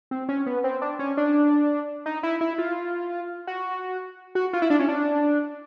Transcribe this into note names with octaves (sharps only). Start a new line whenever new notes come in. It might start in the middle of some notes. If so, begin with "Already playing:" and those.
C4
C#4
B3
C4
D4
C#4
D4
D#4
E4
E4
F4
F#4
F#4
F4
E4
D4
C#4
D4